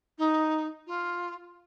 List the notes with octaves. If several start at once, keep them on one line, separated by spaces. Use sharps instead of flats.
D#4
F4